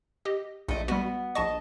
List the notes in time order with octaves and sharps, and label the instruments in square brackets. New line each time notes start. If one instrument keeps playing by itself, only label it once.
[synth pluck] G4 D#5
[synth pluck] A#1 [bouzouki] A3 D#5
[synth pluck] G3 F#4 [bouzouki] B3
[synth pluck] A#1 C#6 [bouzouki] D#5 A5